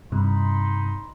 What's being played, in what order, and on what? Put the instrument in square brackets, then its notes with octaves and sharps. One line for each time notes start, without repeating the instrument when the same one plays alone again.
[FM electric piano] G2 C3 [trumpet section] D#4 B5 C6